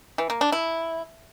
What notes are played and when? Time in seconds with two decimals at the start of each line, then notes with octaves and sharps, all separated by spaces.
0.18 E3
0.30 A#3
0.41 D4
0.52 E4